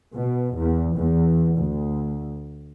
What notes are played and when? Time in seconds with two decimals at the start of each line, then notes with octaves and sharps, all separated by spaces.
0.18 B2
0.58 E2
0.96 E2
1.57 D2